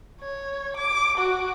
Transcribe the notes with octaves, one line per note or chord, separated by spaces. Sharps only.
C#5
D6
F#4